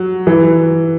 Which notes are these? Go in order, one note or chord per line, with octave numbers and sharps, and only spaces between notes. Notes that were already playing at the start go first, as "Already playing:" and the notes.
Already playing: F#3
E3